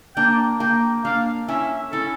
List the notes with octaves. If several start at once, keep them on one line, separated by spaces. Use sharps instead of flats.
A#3 D4 G5
A#3 G5
A#3 D4 F5
C#4 E4 E5
C#4 E4 A4